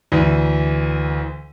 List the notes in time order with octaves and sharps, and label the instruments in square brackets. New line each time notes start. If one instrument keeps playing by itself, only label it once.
[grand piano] D2 E3